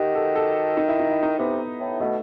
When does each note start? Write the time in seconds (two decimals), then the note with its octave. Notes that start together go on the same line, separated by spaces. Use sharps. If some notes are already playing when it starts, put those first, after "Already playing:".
Already playing: D#3 F#4 G4
0.15 A4
0.36 A4
0.77 D#4
0.88 E4
0.99 D#4
1.10 E4
1.23 D#4
1.39 C3 B3
1.80 A2
2.00 B2 A3